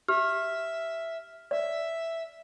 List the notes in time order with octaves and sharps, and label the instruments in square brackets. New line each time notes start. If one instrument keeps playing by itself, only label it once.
[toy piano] G4 [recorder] E5 [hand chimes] F6
[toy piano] D5 [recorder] E5